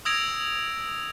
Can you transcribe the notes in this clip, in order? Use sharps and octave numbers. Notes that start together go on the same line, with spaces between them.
D#6 E6 G#6 A#6 D7 F7